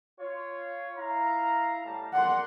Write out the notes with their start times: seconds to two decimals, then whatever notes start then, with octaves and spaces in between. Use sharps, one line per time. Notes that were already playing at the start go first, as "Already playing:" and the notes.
0.19 F4 C#5
0.98 E4 F5 A#5
1.85 A2 G3 A5
2.14 A#4 D5 F#5 C6